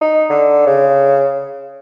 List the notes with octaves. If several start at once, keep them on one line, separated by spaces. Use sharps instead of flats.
D#4
D3
C#3